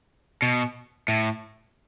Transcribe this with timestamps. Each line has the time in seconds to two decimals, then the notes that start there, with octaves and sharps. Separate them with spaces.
0.42 B2
1.08 A2